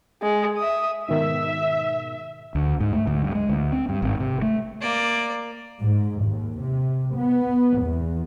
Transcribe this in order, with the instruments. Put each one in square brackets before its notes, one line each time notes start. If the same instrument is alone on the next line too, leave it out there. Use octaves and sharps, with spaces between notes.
[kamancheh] G#3
E5 D#6
[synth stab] G#2 B2 D#3 [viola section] E5
[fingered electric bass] D2
G#2
A3
D2
G2
G#3
D2
C4
G2
G#1
C3
A3
[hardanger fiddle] A#3 D5
[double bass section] G#2
D#2
C3
B3
E2